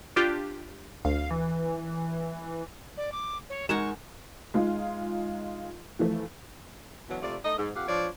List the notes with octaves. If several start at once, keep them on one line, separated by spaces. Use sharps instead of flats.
D4 F4 G4
D2 F5
E3
D5
D6
C#5
G#3 D#4 A#4 F#5 G#5 C#6 E7
G#3 D#4 F4
E3 F3 A3
B2 D3 E3 F#3
C3 A3 F4 D5
A3 D#4 D#5
G#2
F2 G4 F5 F#5
F3 D4 F4 C#5 D5